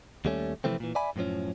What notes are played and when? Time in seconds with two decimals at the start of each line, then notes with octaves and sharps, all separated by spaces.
0.25 D#2 G3 A3 C#4
0.64 C3 E3 F3 A3 C4
0.80 A#2 E3
0.95 D5 E5 G#5 B5
1.16 F#2 A2 D3 F3 C#4